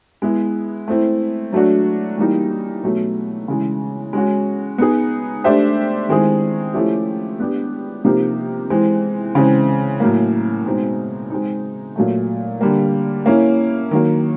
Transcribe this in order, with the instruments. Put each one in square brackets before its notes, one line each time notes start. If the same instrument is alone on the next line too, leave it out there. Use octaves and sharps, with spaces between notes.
[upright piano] G#3 B3 E4
A3 C4 E4
F#3 A3 D4 F#4
E3 G3 A#3 D#4
B2 F#3 A3
C#3 E3 G#3
G#3 C#4 F#4
B3 D#4 G#4
A3 D4 G4 C5 E5
D#3 G#3 C4 E4 G#4
F3 A3 C#4 E4 G4
B3 D4 G4
C3 F3 A#3 D#4 G4
E3 G#3 C4
C#3 E3 G#3 C4
A2 F#3 A#3
B2 G#3 C4 D#4
G#3 C4 D#4
A#2 F#3 A3
D3 G3 A#3
A#3 C#4 E4
D#3 F#3 A#3